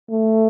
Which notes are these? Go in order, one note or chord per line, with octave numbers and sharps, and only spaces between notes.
A3